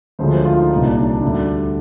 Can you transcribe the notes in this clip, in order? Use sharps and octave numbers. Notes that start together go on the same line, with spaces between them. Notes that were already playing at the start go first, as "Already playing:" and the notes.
D2 D3 F3 G#3 C5
C5
F4
D#4
C2 A#2 G3 D#4
D4
D4
D4
D2 D3 G3